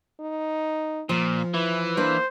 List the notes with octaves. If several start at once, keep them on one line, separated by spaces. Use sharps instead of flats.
D#4
A#2 F3
E3 E4
A#3 D4 B4 C5